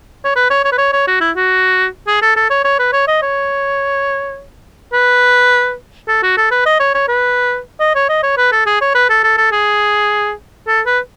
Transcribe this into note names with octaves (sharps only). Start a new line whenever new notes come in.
C#5
B4
C#5
C#5
B4
C#5
C#5
F#4
E4
F#4
G#4
A4
A4
C#5
C#5
B4
C#5
D#5
C#5
B4
A4
F#4
A4
B4
D#5
C#5
C#5
B4
D#5
C#5
D#5
C#5
B4
A4
G#4
C#5
B4
A4
A4
A4
G#4
A4
B4